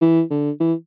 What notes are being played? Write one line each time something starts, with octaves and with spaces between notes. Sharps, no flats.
E3
D3
E3